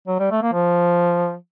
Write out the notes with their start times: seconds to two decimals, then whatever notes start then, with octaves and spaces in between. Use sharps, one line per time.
0.07 F#3
0.19 G3
0.31 A3
0.42 A#3
0.53 F3